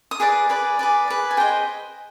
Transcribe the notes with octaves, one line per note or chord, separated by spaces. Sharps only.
D#6
G#4 B4 D5 D6
G#4 B4 D5
G#4 B4 D5
G#4 B4 D5
G#5
G#4 C5 D#5 G5